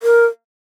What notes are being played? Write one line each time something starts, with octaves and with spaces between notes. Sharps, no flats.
A#4